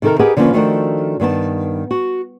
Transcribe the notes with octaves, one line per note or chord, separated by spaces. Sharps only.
C3 D#3 D#4 A4 A#4
G4 G#4 A#4 B4 D#5 F#5
D3 F3 A#3 C#4 F4 B4
D#3 F3 A3 D4 F#4 A#4
G2 D#3 B3 A5
F#4